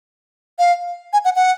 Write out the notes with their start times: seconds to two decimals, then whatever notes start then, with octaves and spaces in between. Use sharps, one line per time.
0.59 F5
1.13 G#5
1.25 F#5
1.36 F#5